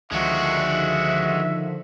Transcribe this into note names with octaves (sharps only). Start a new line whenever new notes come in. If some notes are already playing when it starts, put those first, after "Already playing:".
C#2 D3 D#3 F3 G#3 F#4 E5